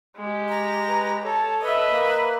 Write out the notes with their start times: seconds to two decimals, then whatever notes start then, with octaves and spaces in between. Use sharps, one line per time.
0.17 G#3 G4
0.49 A#5
0.89 B4
1.24 A4 C#5 A5
1.62 B4 D#5 E5
1.91 A#3